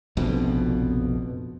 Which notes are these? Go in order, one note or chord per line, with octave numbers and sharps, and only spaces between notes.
F1 A#1 F2 B2